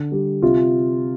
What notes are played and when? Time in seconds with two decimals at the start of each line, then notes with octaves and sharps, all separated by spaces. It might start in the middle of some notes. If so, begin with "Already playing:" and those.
Already playing: D3
0.12 G3
0.42 C3 F4